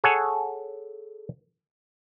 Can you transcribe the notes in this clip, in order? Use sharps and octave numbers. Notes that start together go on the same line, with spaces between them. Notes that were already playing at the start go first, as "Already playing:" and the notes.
G#4 A4 C#5 F#5 G#5